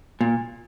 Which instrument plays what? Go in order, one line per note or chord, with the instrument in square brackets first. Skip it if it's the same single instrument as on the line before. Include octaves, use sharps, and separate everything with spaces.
[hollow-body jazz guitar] A#2